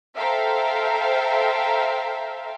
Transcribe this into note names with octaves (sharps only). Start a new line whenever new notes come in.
A4 C5 E5 F5 G5 A#5